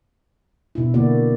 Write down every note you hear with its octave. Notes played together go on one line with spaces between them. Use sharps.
B2 E4
D3 A#3 E4 F#4 D5